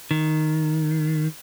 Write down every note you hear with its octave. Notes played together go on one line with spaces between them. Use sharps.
D#3